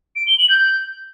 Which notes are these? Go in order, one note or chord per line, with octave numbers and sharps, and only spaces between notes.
D7
G7
F#7
G6